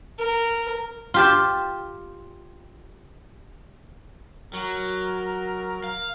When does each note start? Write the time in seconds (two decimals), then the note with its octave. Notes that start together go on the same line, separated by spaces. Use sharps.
0.18 A#4
1.14 F4 G4 A5
4.53 F#3 A#4
5.84 F5